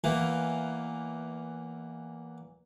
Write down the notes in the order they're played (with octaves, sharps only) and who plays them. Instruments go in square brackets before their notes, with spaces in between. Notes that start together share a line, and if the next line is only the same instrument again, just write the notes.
[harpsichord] E2 E3 A#3